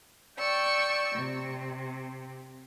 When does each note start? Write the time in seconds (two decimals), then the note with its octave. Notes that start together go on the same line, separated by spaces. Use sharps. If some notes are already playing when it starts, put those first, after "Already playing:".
0.38 D5 G5 C#6 E6
1.16 C3